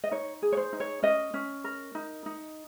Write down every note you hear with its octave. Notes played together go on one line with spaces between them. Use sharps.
D#5
D#4 C#5
G#4
C#5
C5
D#4
C#5
C#4 D#5
C#4
A#4
D#4
D#4